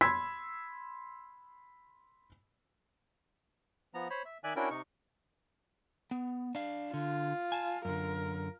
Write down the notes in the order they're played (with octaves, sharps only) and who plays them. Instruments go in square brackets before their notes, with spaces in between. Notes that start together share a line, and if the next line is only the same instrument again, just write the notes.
[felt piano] B5 C6 E6 G#6 B6
[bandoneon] F3 B3 A#5
C5 C#5 B5
E5
D#3 D5 E5 G#5 F#6
C#4 D4 E4 F#4 A#4 G5
C3 D#4 C#6
[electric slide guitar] B3
D4 F5
[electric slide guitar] D3 [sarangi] F4
[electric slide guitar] G#5 A5
[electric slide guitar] F#2 D3 [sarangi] A#4